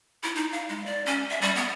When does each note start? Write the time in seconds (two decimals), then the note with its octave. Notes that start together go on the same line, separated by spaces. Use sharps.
0.23 E4
0.35 D#4
0.52 F5
0.69 G#3
0.86 D5
1.06 C#4
1.30 E5
1.41 G3
1.56 B3